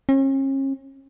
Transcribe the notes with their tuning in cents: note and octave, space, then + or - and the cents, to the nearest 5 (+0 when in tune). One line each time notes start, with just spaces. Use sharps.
C#4 -40